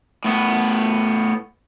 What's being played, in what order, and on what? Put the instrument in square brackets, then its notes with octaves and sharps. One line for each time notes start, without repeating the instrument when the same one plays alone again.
[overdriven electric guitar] A2 B3